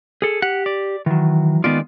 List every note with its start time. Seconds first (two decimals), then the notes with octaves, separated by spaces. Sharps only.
0.22 G#4 A4
0.42 G4 F#5
0.66 D5
1.06 D#3 E3 F#3
1.64 D#3 G#3 B3 F4 D5